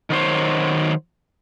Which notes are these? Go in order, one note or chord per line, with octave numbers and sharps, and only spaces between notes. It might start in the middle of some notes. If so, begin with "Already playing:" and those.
D#3 F#3 C5 C#5